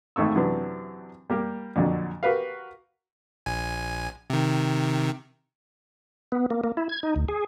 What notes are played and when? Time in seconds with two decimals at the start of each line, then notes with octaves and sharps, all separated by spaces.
0.16 G#1 G#2 A3 C#6 E6
0.36 F#2 C3 E3 F#3 D4 F#4
1.30 G3 A#3 G4
1.76 F2 A#2 D3 F#3
2.23 F#4 G4 A#4 B4 F5
3.46 A#1 G#5
4.30 C3 D#3
6.32 B3
6.50 A#3
6.64 A#3
6.77 E4
6.89 G#6
7.03 D#4
7.16 D2
7.28 G#4